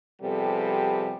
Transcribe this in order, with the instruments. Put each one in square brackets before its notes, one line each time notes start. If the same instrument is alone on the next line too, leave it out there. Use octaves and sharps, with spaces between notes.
[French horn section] C3 F3 G3 B3 G#4 A4